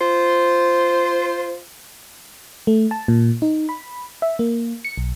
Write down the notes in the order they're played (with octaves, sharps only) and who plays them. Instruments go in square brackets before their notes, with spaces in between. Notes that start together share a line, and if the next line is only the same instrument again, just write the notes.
[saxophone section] F4 C5
[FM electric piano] A3
A5
A#2
D#4
B5
E5
A#3
C#7
B1